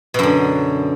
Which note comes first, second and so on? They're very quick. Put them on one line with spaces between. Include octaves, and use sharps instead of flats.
B2 F#2 D3